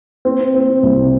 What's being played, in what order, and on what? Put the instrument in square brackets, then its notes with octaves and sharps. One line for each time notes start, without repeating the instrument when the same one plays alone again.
[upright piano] C4
C4
C2